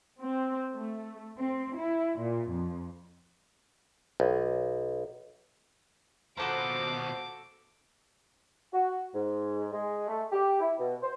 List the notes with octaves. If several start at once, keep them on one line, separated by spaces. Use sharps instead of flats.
C4
A3
C4
E4
A#2
F2
B1
D#2 B2 F3 F#4 A4 C5 A#5 D6
F#4
G#2
G#3
A3
G4
E4
B2
C5